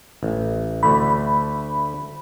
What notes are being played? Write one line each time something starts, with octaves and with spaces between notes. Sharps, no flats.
A1
D2 D3 A3 B5